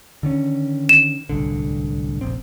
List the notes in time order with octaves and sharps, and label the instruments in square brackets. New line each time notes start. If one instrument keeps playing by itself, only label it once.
[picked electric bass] D3 D#3 C#4
[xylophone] E7
[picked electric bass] D1 C2 D3
F1 A#1 C4